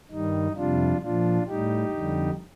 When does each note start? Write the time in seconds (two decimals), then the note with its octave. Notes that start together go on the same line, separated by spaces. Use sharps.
0.11 G2 D#3 G3 D#4
0.56 F2 C3 G3 D4 F4
1.02 A#2 F3 D4 F4
1.48 A2 G3 D#4 G4
1.94 F2 D3 G3